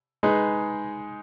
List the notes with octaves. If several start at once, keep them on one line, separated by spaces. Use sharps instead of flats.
G#3 D#4 G#4 B4